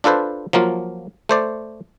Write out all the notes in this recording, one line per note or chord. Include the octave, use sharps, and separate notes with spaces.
D4 F4 A4 B4 C5
F3 F#3 A#3 F4
A3 C5 D5